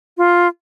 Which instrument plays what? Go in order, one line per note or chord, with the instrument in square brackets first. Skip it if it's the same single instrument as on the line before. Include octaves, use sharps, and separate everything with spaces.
[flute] F4